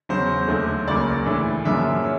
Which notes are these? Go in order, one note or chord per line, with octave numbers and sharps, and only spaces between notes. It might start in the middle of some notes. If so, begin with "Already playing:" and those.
E2 C#3 F#3 C5
D#2 D3 F#3 A3
C#2 C#3 F#3 A#3 D5
A2 E3 A3 D4
F#2 C#3 F3 A#3 D4 E5
C#4